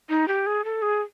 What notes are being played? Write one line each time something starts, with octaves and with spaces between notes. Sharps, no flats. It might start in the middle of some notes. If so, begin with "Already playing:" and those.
D#4
G4
G#4
A4
G#4